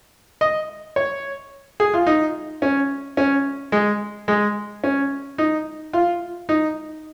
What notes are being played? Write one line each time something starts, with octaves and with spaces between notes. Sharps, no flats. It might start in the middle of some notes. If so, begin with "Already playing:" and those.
D#5
C#5
G#4
F4
D#4
C#4
C#4
G#3
G#3
C#4
D#4
F4
D#4